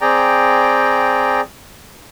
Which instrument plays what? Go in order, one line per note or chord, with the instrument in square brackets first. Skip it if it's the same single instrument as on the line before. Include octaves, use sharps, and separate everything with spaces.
[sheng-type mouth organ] C4 G#4 D5 G5 A#5